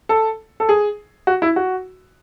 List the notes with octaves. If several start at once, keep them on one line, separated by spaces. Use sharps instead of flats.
A4
A4
G#4
F#4
E4
F#4